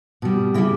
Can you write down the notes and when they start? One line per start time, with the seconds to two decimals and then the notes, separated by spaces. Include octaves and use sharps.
0.22 B2 G3
0.54 C#3 E4
0.58 G3